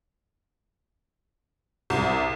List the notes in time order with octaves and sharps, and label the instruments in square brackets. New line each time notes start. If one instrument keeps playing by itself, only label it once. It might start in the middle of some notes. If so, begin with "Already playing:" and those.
[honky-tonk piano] C2